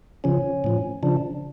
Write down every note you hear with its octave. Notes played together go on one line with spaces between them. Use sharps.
C#3 F3 C#4
A2 F3
C#3 F3 D4